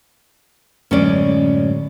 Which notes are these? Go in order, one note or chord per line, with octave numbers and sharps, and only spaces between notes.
D1 F#2 G#3 C#4 D5